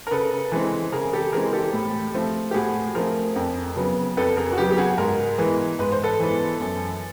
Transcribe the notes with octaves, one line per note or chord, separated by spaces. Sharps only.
A#4
C#3 A4 B4
E3 G#3 C4
C#3 G#4 A#4
G4 A4
E3 G#3 C4 G#4 A#4
G4 A4
A2
F3 A3 C4
G4
A2 F#4 G#4
F3 A3 C4 G#4 A#4
F2
C#3 F#3 B3
F2 A4 B4
G#4 A#4
F#4
C#3 F#3 B3 G4
G4
F#4 G#4
G#2 G#4 A#4
E3 G#3 B3
G#2 B4
C5
A4 B4
E3 G#3 B3
F#2